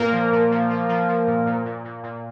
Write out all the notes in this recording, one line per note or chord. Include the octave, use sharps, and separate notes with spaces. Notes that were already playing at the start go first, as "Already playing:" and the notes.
Already playing: A#2 A#3 A#4
F3
A#2
F3
F3
F3
F3
A#2
A#2
A#2
A#2
A#2